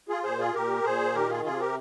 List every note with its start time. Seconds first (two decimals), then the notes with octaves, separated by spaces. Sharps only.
0.09 F4 G#4
0.23 A#2 G#4 C5
0.39 F4 G#4
0.54 A#2 G4 A#4
0.84 A#2 G#4 C5
1.15 D#3 G4 A#4
1.29 F4 G#4
1.44 C3 F4 G#4
1.59 G4 A#4